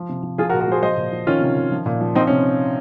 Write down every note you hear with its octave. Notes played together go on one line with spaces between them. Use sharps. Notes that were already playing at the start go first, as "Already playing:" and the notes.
Already playing: F3
C3
F3
F3 F4 G#4
F#4 A#4
A#2
F#4 A#4
F3 G#4 C5
F3 C5 D#5
A#2
F3
D#3 C#4 F4
C3
D#3
F3
A#2
F3
F3 C4 D#4
C#4
C3